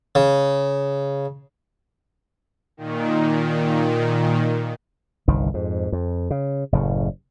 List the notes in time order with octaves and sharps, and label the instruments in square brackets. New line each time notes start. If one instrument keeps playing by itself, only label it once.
[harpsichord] C#3
[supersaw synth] A#2 D#3
[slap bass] G1 C2 D#3
F2 G#2
F2
C#3
F#1 A2 C#3